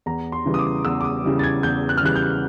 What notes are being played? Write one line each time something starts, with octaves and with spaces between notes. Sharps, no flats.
E2 A#5
C6
C#3 E3 G3
D#6
D6
E2 E6
D6
D#6
C#3 E3 G3
A6
G#6
E2 G6
F#6
F6
C#3 E3 G3 F#6
G6